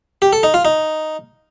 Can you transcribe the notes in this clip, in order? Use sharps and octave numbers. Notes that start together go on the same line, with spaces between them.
G4
A4
D#4
F4
D#4